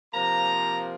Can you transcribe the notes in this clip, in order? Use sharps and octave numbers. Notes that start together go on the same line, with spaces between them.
C3 F3 A#3 A#5